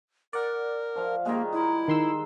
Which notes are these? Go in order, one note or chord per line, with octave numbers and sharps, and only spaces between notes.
A#4 D5 F#5
F3 F5
D#3 G3 G#3 A#3
D#4 E4
D#3 C6 E6